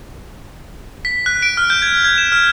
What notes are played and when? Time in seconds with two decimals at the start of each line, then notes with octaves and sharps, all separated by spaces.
1.05 B6
1.26 F#6
1.42 D7
1.57 F6
1.70 G6
1.82 G#6
2.04 G#6
2.18 E7
2.32 F6